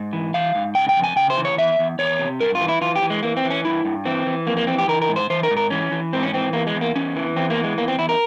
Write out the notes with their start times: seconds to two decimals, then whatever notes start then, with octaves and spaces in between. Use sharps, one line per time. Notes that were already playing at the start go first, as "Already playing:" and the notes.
Already playing: G#2
0.13 E3
0.34 E3 F5
0.55 G#2
0.75 C#3 G5
0.89 G5
0.96 F2
1.04 G#5
1.16 C#3 G5
1.30 C5
1.37 E3
1.45 C#5
1.58 E2 E5
1.79 E2
1.99 E2 C#5
2.19 C3
2.41 G2 A#4
2.55 F4
2.61 E3
2.68 E4
2.81 E3 F4
2.96 G4
3.02 E3
3.10 G#3
3.23 E3 A#3
3.37 C4
3.44 E3
3.50 C#4
3.65 G2 E4
3.85 G2
4.05 E3 C4
4.27 E3
4.47 F2 A#3
4.57 A#3
4.67 E3 C4
4.78 G4
4.88 E3 A#4
5.02 A#4
5.09 G#2
5.16 C5
5.30 E3 C5
5.43 A#4
5.51 G#2
5.57 A#4
5.70 E3 C#4
5.92 E3
6.13 G#2 C4
6.23 C#4
6.33 E3 C4
6.53 E2 A#3
6.67 G#3
6.75 E2
6.81 A#3
6.95 E2 C#4
7.16 E3
7.36 E2 C4
7.50 A#3
7.57 E3
7.64 G#3
7.77 E2 A#3
7.88 C4
7.98 E2 E4
8.09 A#4